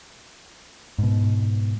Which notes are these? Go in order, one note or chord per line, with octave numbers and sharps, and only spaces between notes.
G#2 B2